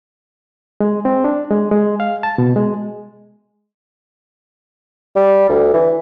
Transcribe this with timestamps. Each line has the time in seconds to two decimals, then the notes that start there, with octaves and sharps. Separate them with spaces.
0.80 G#3
1.05 C4
1.24 D4
1.50 G#3
1.71 G#3
2.00 F5
2.23 A5
2.38 B2
2.56 G#3
5.16 G3
5.49 D2
5.73 E3